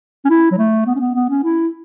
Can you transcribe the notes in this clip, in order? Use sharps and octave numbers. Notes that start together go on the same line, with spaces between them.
C#4
E4
F#3
A3
B3
C#4
B3
B3
C#4
E4